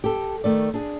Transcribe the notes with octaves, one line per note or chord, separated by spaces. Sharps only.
G4 A4
D#3 A3 D5
D4 G#4